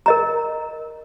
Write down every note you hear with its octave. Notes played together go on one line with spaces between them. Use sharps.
A#4 D#5 A#5